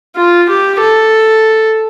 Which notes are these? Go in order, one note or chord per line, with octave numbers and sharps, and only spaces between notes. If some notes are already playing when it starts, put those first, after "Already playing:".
F4
G4
A4